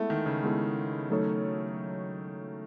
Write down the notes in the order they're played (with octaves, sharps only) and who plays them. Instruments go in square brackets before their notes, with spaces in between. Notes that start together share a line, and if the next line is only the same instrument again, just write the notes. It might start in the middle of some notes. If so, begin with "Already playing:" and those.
Already playing: [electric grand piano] G#3 B3 E4 A4 [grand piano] A3
[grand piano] D#3
C#3
[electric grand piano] G#3 B3 E4 A4
F#3 A3 D#4 A4 C#5